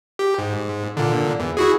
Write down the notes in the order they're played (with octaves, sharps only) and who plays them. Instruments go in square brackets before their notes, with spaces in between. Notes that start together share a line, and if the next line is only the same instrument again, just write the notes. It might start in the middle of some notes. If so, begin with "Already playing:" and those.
[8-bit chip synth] G4
G#2
A#2 D3
E2
E4 F#4 G#4